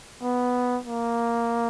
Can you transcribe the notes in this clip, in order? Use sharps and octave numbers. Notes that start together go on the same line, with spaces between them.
B3
A#3